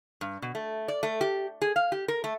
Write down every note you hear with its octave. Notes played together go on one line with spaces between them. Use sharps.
G2
B2
A3
D5
A3
G4
G#4
F5
G4
A#4
A3